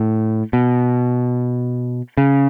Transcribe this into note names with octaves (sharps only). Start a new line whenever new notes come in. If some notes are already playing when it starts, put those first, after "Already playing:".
Already playing: A2
B2
C#3